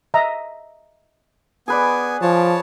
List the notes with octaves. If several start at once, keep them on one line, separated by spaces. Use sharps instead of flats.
D#5 E5 A#5
B3 G#4 B4 D5 G#5
F3 C#5 A5